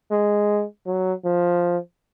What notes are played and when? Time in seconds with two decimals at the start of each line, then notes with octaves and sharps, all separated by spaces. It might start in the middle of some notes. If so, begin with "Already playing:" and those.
0.11 G#3
0.86 F#3
1.25 F3